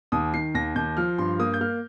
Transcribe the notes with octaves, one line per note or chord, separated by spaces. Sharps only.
D#2 D#6
D#3 C7
D#2 A#6
D#2 G6
F3 F6
G2 C6
A#3 D#6
G6
A#3 F6